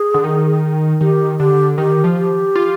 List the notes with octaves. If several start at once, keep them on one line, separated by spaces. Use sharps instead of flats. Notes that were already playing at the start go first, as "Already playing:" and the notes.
Already playing: G#4
D3
D#3
D#3 G4
D3 G4
D#3 G4
F3
G4
F4